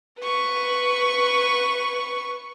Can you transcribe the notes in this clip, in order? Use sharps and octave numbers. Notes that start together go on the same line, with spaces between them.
B4 C#6